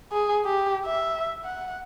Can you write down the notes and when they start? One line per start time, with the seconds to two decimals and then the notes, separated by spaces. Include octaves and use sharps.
0.12 G#4
0.45 G4
0.86 E5
1.44 F#5